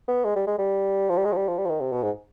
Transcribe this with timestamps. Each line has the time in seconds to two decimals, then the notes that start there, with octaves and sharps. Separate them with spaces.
0.08 B3
0.25 G#3
0.36 G3
0.47 G#3
0.58 G3
1.09 F3
1.17 G3
1.25 G#3
1.32 F3
1.36 G3
1.48 F3
1.58 G3
1.65 F3
1.70 D#3
1.81 C3
1.92 B2
2.03 G#2